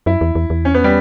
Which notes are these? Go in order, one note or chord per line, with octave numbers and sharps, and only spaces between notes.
F#2 E4
E2
E2
E2
C#4
B3
G3